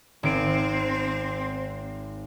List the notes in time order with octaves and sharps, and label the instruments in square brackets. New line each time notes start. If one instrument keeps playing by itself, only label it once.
[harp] G#1 D7 [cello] C4